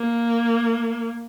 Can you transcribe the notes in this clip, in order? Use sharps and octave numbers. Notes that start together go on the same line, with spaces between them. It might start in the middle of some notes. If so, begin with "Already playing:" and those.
Already playing: A#3